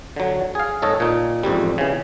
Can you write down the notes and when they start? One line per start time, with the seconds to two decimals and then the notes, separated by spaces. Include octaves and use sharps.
0.16 D3 F#3
0.55 G#4 F5
0.82 G#2 A4 C#5 D#5 A5
1.00 A#2 D#4
1.43 A1 F2 G#2 G3
1.78 C#3 E3